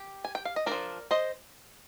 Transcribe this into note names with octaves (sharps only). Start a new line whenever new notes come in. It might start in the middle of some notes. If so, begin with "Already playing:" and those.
Already playing: G4
G#5
G5
F5
D#5
A#3 D4 A#4 D5
F3
C5 D#5